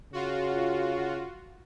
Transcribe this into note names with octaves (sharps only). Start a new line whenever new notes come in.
C#3 F4 F#4